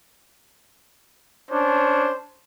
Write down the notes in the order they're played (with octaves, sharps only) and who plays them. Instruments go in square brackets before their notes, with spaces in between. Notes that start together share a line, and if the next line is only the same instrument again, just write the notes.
[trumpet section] C#4 D4 C5